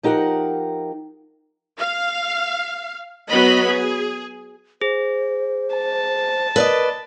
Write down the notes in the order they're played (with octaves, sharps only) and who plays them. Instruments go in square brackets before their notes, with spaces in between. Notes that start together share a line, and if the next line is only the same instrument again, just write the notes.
[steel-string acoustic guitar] F3 D#4 G4 A#4 F#5
[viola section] F5
F#3 B3 D#5 B5
G#4
[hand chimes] G#4 [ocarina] C5
[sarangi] A5
[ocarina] A#4 [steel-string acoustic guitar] B4 D5 D#5